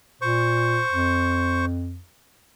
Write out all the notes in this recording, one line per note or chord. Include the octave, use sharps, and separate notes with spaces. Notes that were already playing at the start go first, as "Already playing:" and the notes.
A#2 C5 C#6
F2